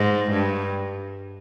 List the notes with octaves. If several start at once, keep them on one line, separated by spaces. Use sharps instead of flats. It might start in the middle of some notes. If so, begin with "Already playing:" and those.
Already playing: G#2
G2